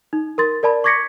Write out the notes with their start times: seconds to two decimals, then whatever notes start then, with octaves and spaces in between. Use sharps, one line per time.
0.13 D#4
0.38 A#4 C6 A6
0.63 A#4 D5 A5 B5
0.84 C#6 D6 G#6 A#6 B6 C#7